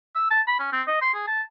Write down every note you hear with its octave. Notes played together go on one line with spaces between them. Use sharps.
E6
A5
B5
C#4
C4
D#5
C6
G#4
A5